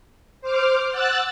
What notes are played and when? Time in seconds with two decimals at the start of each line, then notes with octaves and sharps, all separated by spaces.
0.41 C5 D6 F6
0.91 F#5 E6 F#6 A6